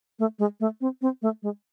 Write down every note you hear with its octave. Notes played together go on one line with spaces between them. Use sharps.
A3
G#3
A3
C4
C4
A3
G#3